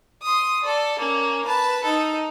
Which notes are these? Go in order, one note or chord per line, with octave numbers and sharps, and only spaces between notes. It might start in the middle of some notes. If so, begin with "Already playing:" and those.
C6 D#6
A4 D5
A#3 C#4
B4 A5
D#4 A4